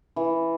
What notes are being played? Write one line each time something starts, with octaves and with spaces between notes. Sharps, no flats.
E3